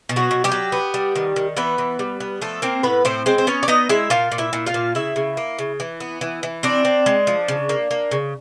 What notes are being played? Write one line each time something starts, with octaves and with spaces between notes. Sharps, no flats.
B2
F#3 F#4
B2
G3 G4
F#3
B3
G3
D#3
D#3
E3 B3 B4
E3
G3
B3
F3 A3 A4
A#3 C4 A#4
A2 B3 B4
A2 C4 C5
G#3 C4 C5
C5
B3 C#4 C#5
D5
B3 D#4 D#5
G#3 E4 E5
A#2 F4 F5
A#2
E4 E5
A#2
F4 F5
A#2
C#3 E4 E5
C#3
A#3
C#3
E3
B3
E3
E3
C4 D4 D5
C4
G#3
F3
C#3
A#3
A#3
C#3